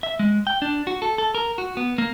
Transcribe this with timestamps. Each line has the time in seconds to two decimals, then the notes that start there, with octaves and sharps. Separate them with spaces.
0.03 E5
0.19 G#3
0.47 G5
0.62 D4
0.87 F#4
1.02 A4
1.18 A4
1.35 A#4
1.58 F#4
1.77 B3
1.98 A#3